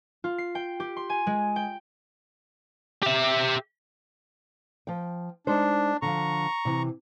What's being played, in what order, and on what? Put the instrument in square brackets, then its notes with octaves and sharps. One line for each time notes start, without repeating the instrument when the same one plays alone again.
[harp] F4
C7
G5
G4
C6
G#5
G#3
G5
[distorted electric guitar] G4 E5
[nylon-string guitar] F3 G5
[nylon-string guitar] G#3 D#4 C5 [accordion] D4
[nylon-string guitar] D3 F3 [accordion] A#5 C#6
[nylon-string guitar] C3 E3